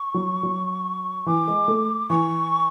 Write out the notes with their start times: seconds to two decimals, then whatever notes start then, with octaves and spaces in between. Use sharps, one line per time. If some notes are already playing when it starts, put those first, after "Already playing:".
Already playing: C#6
0.14 F#3
0.43 F#3
1.26 E3 D6
1.47 G#3
1.68 A3
2.09 E3 C#6